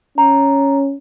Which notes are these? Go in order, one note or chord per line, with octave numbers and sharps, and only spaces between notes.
C#4 A#5